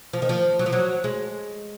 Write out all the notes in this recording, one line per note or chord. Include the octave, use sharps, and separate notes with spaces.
F3
D#3
F3
F#3
F3
F#3
G#3